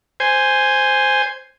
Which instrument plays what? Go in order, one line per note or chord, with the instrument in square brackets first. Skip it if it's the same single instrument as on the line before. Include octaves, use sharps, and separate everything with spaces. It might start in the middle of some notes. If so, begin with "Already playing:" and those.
[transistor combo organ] C5 G#5